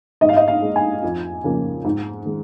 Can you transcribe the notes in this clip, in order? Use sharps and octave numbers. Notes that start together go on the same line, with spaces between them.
G#2 D#5
F5
D#5
F5
G#3
G#5
F2
C#3 F3 A#3
G#2
D#3 G#3